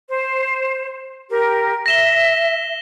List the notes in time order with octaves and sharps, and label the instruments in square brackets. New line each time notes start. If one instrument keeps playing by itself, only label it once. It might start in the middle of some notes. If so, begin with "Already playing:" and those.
[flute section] C5
G4 A#4
[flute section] E5 [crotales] A#6 E7 G7